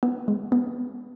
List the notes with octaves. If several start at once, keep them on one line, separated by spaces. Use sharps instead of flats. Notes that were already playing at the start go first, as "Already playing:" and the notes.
B3
G#3
B3